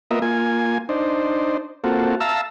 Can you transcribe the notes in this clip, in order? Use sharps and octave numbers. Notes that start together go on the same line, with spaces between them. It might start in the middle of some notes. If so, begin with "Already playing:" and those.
A#3 B3 F4 A#4 D#5 E5
A#3 F4 G#5
D4 D#4 C5
A#3 C4 F4 F#4 A4
E5 F5 A5 A#5 E6